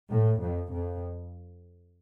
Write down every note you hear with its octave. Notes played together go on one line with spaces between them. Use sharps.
A2
F2
F2